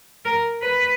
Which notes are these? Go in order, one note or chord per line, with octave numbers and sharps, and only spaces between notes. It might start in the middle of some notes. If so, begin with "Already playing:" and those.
A#4
B4